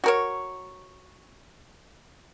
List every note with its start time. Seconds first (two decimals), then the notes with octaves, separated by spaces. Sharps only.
0.04 F#4 A#4 C#5